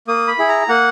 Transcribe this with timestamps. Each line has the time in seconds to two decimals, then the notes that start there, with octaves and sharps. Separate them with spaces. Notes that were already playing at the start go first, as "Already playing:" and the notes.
0.08 A#3 D#6
0.28 B5
0.38 E4 G#4
0.49 A#5
0.69 A#3 F#5